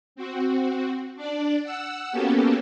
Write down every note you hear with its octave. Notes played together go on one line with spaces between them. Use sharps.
C4 F#4
D4 D5
F#5 E6
A#3 B3 C#4 F#4 G4 A4